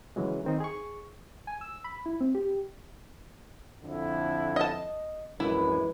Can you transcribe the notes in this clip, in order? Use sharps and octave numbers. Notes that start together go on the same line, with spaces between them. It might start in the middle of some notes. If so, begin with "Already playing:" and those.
C#3 E3 F#3 G#3
D#3 C4 D#4
G#4 C#6
G#5
E6
B5
E4
C4
G4
F2 D3 E4
D#5 A5
A#1 F#2 E3 G#3 E4